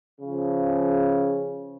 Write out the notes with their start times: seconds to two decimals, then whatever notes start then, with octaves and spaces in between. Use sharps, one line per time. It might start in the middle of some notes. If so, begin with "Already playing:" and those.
0.19 C#3 F3